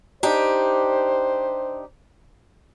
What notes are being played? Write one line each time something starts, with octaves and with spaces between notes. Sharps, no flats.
D4 D#4 G4 C5